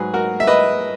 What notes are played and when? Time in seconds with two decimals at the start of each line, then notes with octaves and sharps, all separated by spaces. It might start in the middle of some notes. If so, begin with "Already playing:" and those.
Already playing: G#2 F#3 G#4 B4
0.14 F#4 A#4
0.40 E5
0.47 B4 D#5